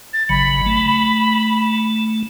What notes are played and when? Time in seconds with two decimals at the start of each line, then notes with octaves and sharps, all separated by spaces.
0.13 A6
0.29 G#1 C#3 F#3 B5
0.66 A3